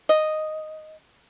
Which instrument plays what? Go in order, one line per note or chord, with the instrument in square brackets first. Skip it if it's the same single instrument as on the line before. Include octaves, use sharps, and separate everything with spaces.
[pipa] D#5